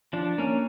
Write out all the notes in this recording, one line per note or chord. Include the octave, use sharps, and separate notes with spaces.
F3 D4
A#3 C#4